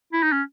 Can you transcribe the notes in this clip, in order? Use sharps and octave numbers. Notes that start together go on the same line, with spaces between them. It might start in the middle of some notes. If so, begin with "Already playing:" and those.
E4
D#4
C#4